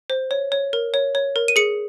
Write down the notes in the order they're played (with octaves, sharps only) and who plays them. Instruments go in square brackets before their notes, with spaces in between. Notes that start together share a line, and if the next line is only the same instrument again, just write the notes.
[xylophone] C5
C#5
C#5
A#4
C#5
C#5
A#4
D#7
G#4 C#7